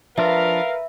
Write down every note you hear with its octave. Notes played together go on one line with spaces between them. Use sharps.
F3 D4 F4 A#4 B4 E5 F5